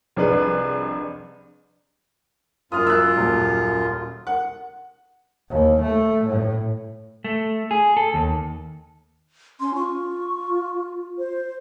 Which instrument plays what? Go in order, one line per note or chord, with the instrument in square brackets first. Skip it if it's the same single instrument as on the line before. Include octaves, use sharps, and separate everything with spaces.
[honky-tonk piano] C2 F2 D4 G#4 B4 F#6
[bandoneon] F#2 F4 [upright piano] D#6 F6
[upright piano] E6 F#6
D#1
F#5
[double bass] D#2
A3
A2
[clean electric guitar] A3
G#4
A4
D#2
[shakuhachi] C#4 [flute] C6
[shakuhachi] F4 [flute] C#6
[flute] C5